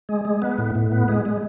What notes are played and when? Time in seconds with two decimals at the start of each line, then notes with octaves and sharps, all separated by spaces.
0.09 G#3
0.25 G#3
0.42 B3
0.58 A2
0.75 A2
0.92 B3
1.08 G#3
1.25 G#3